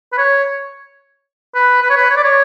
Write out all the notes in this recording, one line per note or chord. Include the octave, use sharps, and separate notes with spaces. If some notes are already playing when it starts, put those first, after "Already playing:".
B4
C#5
B4
B4
C#5
B4
C#5
D5
C#5